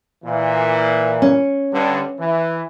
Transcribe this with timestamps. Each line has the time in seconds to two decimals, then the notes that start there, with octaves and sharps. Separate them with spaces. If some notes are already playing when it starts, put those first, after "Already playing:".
0.24 A#2 E3
1.22 C#4
1.72 G2 D3
2.19 E3